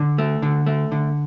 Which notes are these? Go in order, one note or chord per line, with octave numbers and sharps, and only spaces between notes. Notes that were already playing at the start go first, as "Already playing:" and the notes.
Already playing: D3
A3
D3
A3
D3